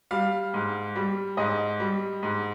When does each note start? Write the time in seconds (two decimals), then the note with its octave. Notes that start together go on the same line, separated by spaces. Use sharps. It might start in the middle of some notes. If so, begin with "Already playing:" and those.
0.11 G3 F5
0.54 G#2
0.95 G3
1.37 G#2 D#5
1.80 G3
2.22 G#2